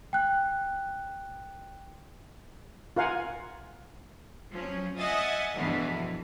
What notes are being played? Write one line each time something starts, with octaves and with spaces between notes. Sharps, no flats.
G5 F#6
F4 A#4 F5 F#5 G#5
F3 F#3 C#4
D#5 E5 F#5 G#5 D#6 A6
E2 G2 B2 D3 E3 F3